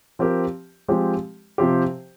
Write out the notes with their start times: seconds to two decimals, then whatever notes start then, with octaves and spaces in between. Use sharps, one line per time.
0.19 F3 C4 G4 A#4
0.88 F3 G#3 C4 G4
1.58 C3 F3 C4 G4 C5